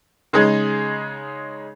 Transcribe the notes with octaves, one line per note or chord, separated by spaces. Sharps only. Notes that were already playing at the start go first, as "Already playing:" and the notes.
C#3 G#3 D#4 G#4